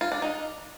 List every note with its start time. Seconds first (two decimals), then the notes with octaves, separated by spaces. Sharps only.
0.01 F4
0.12 D4
0.22 D#4